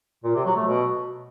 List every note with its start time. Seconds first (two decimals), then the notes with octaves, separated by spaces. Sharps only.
0.24 A#2
0.35 C3
0.45 F#3
0.56 A3
0.67 B2